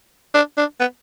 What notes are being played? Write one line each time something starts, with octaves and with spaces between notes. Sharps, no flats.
D4
D4
B3